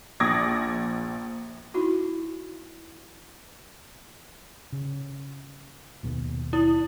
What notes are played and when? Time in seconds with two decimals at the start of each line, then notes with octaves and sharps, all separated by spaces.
0.20 A#1 D6 D#6 G#6 A#6
1.74 D#4 E4 F#4
4.72 C#3
6.03 G#1 D#2 B2
6.53 E4